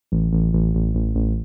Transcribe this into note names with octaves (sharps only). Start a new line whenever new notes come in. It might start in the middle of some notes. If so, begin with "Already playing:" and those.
A1
A1
A1
A1
A1
A1